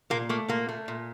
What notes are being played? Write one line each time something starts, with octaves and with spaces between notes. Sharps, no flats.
A#2 A#3
A3 A#3
A#2 A#3
A3
A#2